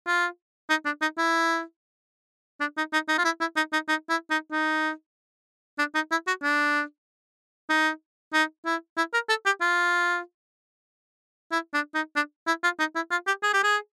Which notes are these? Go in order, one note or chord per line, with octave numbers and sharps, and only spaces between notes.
F4
D#4
D4
D#4
E4
D4
D#4
D#4
D#4
F4
E4
E4
D#4
D#4
D#4
E4
D#4
D#4
D4
D#4
E4
F#4
D4
D#4
D#4
E4
E4
A#4
A4
G4
F4
E4
D4
D#4
D4
E4
F4
D#4
E4
F4
G4
G#4
G4
G#4